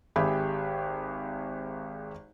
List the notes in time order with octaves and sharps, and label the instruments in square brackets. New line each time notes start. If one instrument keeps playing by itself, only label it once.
[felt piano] G#1 G4 G#4 E5 G5 B5